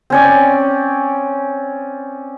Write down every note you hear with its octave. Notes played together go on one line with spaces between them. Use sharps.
C4 C#4 D5